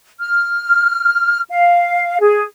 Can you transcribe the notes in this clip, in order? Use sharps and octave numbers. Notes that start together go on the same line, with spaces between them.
F6
F5
G#4